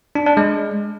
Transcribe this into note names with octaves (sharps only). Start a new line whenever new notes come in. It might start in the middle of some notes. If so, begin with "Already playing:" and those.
D4
D4
G#3